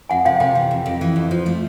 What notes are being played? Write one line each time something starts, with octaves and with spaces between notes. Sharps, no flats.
F2 F#5 G#5
C3 F5 G5
C3 F5 G5
E3
F2
F2
E3
F2
F3
A3